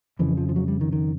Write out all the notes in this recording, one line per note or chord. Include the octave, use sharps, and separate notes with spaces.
F2 C#3 E3
F3
F3
F#3
G3
D#3
D#3